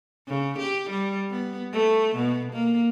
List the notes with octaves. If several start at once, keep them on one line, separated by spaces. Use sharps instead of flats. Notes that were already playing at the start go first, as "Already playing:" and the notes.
C#3
G4
G3
B3
A3
B2
A#3